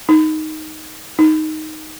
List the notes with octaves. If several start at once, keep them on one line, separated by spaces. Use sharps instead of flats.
D#4
D#4